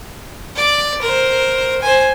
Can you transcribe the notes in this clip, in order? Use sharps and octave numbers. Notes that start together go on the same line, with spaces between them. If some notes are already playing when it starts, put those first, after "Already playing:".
D5
A#4 C5
C5 G#5